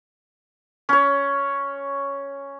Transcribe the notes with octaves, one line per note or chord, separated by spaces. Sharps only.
C#4 C#5